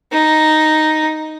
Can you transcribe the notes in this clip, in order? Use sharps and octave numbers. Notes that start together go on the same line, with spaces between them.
D#4